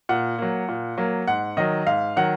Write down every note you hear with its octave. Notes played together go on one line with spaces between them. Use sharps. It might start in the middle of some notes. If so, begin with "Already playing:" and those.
A#2 F#5
F#3 A#3
A#2
F#3 A#3
G#2 F#5
D#3 F#3 D#5
G#2 F5
D#3 F#3 F#5